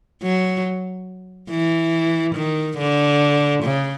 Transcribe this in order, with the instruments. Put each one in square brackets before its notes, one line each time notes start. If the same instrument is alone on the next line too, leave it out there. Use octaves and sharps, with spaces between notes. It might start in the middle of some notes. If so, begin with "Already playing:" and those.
[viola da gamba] F#3
E3
D#3
D3
C#3